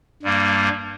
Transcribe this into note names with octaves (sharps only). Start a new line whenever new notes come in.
G2 G3 A#3